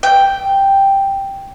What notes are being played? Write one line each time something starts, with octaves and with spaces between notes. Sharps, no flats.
G5